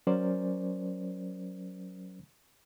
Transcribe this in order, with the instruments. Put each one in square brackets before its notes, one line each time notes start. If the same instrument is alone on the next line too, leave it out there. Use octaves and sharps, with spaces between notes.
[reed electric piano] F#3 C#4 A#4 C5 D5